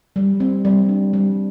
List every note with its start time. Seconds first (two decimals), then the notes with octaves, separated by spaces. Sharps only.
0.16 G3
0.40 C4
0.65 G3
0.89 D4
1.13 G3